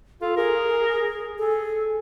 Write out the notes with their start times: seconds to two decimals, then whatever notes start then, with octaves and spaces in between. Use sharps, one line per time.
0.21 F4 A4
0.36 G#4 A#4
1.38 G#4 A4